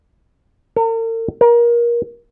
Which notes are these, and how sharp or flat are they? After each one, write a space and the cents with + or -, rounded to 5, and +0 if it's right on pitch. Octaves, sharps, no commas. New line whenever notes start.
A#4 -45
A#4 +25